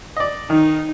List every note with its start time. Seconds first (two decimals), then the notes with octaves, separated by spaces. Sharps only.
0.17 D5 D#5
0.50 D#3 D#4